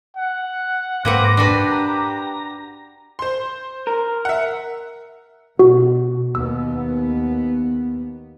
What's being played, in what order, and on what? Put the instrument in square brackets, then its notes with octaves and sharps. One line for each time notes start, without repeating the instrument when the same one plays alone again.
[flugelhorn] F#5
[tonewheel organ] G#2 D6 A#6 [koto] A#3 B4 F#5 [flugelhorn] C4
[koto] D4 F#4 B4 [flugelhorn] G4
[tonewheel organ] A#5
[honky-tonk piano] C5 C6
[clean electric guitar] A#4
[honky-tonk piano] E5 F#5
[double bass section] B2 [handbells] F#4
[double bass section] D#2 B3 [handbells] E6